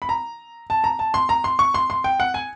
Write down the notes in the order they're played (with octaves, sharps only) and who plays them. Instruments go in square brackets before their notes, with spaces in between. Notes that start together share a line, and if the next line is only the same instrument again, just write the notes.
[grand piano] B5
A#5
A5
A#5
A5
C6
A#5
C6
C#6
C6
C6
G5
F#5
G#5